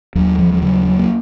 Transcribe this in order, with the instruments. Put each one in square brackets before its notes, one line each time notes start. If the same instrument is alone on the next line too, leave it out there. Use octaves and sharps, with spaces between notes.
[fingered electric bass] D#2 F#3
F3
F3
C#3 F#3
F#3
A#3